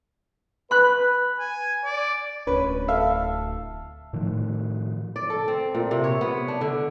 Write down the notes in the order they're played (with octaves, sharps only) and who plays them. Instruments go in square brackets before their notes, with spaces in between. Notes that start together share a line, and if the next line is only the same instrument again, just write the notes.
[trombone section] B4 [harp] B5 F#6
[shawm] G#5
D5
[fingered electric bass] D1 [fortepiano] C#4 B4
[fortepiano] A4 E5 F5
[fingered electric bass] A2 D#3 F3
[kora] D5
A4
C4
A#2
C3
C#5
B3
D4
D3